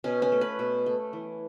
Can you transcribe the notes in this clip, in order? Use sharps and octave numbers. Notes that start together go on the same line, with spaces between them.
B2 C#4
C#4
A3
B4
B2
A3
E3